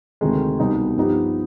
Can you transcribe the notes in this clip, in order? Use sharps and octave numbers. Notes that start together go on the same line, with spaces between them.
D2 C3 D#3 G#3
C2 B2 G3 B3 D#4
G2 F3 B3 D#4 G4